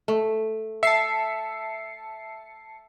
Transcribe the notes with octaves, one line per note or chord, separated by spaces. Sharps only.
A3
E5 A5 C7 C#7